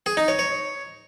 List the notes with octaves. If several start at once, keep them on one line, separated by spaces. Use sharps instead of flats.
G#4
D#4
C#5
C#5